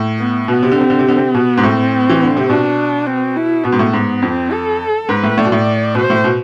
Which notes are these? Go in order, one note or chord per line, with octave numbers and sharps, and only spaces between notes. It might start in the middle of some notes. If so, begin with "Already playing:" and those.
Already playing: A2
B3
B2 B3
C3
D3
C3 C4
D3
C3
D3
C3
B2 B3
G#2
A2 C4
E3
D3
C3
B2 D4
C4
E4
B2 B3
G#2
A2
G#2
F2 C4
A4
G#2 B4
A2
A2 D5
B2
A2
B2 C5
A2
B2